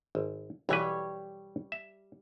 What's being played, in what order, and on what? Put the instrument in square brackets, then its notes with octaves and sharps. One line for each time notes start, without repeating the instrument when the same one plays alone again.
[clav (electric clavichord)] G#1
[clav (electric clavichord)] B1 E3 B4 [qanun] G3 C#5 G5
[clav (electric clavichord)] E5